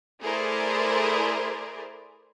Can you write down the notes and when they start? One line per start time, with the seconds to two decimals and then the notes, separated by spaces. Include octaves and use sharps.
0.22 A3 E4 G#4 A#4 C5 D5